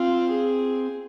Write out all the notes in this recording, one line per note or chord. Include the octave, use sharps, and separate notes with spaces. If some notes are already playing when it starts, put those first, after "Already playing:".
Already playing: C4 F4
G#4